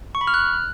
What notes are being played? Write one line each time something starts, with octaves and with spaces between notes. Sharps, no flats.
C#6
B5
F6
F#6